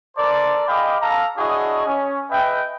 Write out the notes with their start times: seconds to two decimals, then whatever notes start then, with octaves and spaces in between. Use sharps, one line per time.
0.17 A4 A#4 C5 D5
0.67 G#4 D#5 F5 G5 B5 D6
1.02 A4 F5 A#5
1.38 D4 E4 F#4 G#4 C#5 D#5
1.86 C#4
2.31 G#4 B4 D#5 E5 G5